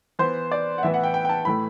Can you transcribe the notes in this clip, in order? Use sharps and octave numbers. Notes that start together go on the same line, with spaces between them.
E3 B3 C5
D5
F#5
A2 E3 B3 E5
F#5
G5
G5
G5
A5
A2 E3 A3 B5